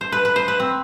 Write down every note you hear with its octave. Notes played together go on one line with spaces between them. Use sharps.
C5
B4
B4
C5
B4
C4